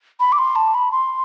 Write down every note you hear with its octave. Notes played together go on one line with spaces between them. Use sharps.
B5
D6
C6
A5
B5
C6